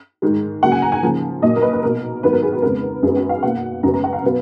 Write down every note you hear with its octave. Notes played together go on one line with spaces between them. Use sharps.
G#2 D#3 G#3
C#3 F#3 A#3 F#5
G#5
A#5
G#5
C#3 F3 A#3
A#2 F#3 A#3 D#5
A#4
B4
B4
B2 A#3 A#4
G#2 D#3 F#3 B3 B4
A#4
G#4
F#4
F2 C#3 G#3 B3 A#4
F#2 D#3 G#3 B3 G#4
F#4
F5
B2 A#3 F#5
F#2 C#3 G#3 B3 A#5
A#5
F#5
F5
B2 F#3 B3